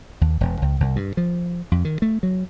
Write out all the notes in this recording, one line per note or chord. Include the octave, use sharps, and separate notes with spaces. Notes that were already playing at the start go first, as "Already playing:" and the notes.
D#2
E1
C#2
C2
G2
F3
F2
D#3
A3
F#3